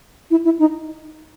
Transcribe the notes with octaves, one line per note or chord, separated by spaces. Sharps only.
E4
E4
D#4